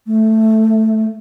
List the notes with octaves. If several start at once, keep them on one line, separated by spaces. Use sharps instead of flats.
A3